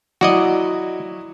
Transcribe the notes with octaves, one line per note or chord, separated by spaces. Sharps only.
F#3 E4 F#4 D5 D#5